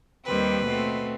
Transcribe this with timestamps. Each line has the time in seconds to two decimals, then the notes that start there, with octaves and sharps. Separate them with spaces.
0.24 D#2 D#3 G3 C4 B4
0.66 B2 A3 C4